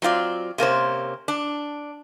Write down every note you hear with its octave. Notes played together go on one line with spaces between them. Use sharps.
F#3 C4 F4 D5
C3 A#3 C#4 C5
D4